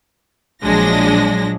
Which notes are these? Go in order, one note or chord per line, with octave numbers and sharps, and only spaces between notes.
A#1 F3 F#3 G#3 D4 A#6